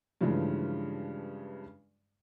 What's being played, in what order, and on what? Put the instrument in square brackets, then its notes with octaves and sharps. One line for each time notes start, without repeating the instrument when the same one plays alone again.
[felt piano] G2 C#3 E3 F3 G#3 A3